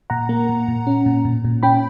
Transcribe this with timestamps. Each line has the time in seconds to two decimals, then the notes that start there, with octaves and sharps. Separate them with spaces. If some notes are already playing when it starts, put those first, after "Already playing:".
0.10 A#2 F#5 A#5
0.29 A#3
0.49 A#2
0.68 A#2
0.87 C#4
1.06 A#2
1.25 A#2
1.45 A#2
1.63 C#4 G5 B5